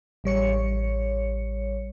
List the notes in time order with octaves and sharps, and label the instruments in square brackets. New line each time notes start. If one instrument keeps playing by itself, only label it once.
[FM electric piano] A1 G3 C#5 C#7